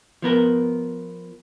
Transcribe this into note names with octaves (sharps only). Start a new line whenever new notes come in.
F3 B3 A#4